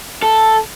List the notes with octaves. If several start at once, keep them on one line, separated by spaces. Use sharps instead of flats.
A4